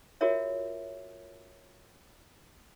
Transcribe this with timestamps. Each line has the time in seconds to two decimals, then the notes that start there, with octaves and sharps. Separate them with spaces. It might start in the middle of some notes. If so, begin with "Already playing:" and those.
0.21 F4 F#4 G#4 A#4 C#5 E5